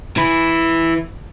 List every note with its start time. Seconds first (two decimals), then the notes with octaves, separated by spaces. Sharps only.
0.17 E3 E4